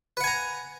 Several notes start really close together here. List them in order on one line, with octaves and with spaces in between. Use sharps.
B4 F#5 G#5 A#5